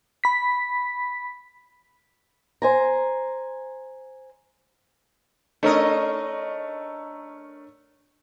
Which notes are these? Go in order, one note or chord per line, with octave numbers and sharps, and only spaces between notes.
B5 B6
C5 G#5 A#5
A3 C#4 D4 A#4 D#5